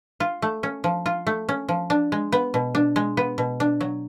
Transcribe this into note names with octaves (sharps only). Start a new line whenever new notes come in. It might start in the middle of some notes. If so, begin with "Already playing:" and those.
F4
A3
C#4
F3
F4
A3
C#4
F3
D4
G#3
B3
B2
D4
G#3
B3
B2
D4
F#3